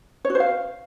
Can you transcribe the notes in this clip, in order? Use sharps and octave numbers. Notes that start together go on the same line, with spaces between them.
C#5
F#4
C5
F5